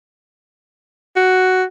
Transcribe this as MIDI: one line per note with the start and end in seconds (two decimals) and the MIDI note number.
1.16 1.64 66